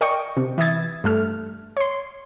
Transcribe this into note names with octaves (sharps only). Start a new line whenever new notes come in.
A#4 D5 D#5 G5 C#6
C3
E3 E5 D#6 G#6 A6
G2 A3 F6
C#5 C6